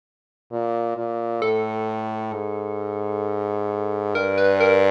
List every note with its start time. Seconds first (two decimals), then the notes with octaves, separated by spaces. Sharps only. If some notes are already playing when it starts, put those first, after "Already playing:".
0.52 A#2
0.97 A#2
1.42 A2 A4
2.33 G#2
4.15 G2 A#4
4.38 B4
4.60 A#4